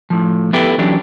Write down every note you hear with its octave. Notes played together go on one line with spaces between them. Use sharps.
A2 F3
B3 E4 G4 A4 B4 G5
E3 F#3 C#4 D4 G4